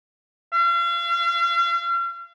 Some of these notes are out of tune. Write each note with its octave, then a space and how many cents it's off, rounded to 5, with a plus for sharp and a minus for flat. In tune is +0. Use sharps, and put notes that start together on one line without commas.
F5 -40